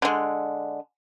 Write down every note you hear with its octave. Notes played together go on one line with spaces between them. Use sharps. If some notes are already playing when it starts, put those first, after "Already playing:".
D3 G#3